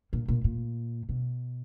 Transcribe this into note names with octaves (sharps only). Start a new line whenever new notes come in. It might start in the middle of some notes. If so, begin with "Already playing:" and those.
A#2
A#2
A#2
B2